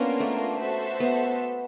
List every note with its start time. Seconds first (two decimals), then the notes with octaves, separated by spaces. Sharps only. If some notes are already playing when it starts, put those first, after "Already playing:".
Already playing: A#3 B3 C#4 D4 F4 A#4
0.20 A3
0.60 F#4 A4 C5 E5
1.00 B3